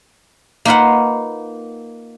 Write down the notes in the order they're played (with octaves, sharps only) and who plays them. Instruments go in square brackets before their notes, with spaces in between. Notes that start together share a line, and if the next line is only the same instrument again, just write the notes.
[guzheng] A#3 D#4 F4 B4 F5 F#5